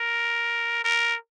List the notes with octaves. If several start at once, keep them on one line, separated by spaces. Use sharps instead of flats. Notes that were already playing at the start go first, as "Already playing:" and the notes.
Already playing: A#4
A#4